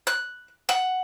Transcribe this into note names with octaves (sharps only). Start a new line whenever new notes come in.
F#6
F#5